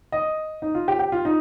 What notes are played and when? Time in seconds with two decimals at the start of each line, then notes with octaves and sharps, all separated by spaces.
0.12 D#5
0.62 D#4
0.75 F4
0.88 G4
0.99 G4
1.12 F4
1.25 D#4